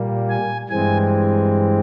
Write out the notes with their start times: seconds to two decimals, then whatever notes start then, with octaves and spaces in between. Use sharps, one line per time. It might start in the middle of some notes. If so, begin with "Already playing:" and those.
Already playing: A#2 G3 A#3
0.29 G#5
0.69 G2 E3 G#3 C4 G#5